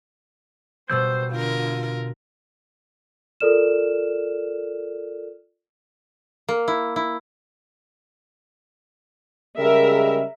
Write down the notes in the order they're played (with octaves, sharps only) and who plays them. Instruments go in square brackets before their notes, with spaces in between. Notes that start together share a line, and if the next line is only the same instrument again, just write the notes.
[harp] B2 G3 B3 [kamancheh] C5 [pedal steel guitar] E6 G6
[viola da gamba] D3 A#4 [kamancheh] F4
[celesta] F4 A4 A#4 D5 F6 E7
[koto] A#3
E4
E4
[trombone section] C#3 G3 G#3 [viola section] A#4 E5